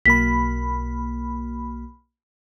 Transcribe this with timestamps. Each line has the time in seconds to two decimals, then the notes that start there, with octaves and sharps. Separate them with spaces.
0.06 B1 A#3 B5 B6